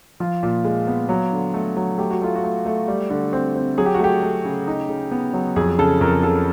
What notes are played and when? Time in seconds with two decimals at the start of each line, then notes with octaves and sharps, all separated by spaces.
0.20 F3 F4
0.43 A#2
0.65 G#3
0.87 B3
1.09 F#3
1.32 D3
1.54 A3
1.76 F#3
1.98 A3 G4
2.11 F#4
2.22 A3 F4
2.36 F#4
2.44 A3
2.66 A3
2.88 G3
3.10 D3
3.33 C4
3.55 C4
3.78 F#3 G#4
3.86 G4
3.95 F#4
3.99 A3 G4
4.22 A3
4.45 C#3
4.67 D#4
4.89 C#3
5.11 B3
5.33 F#3
5.56 F2 G#4
5.79 C#3 A4
6.01 F2 A#4
6.23 C#3 A4